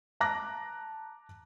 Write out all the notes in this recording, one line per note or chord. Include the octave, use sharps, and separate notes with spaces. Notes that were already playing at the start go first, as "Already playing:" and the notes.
A5 A#5 D6 F#6 A#6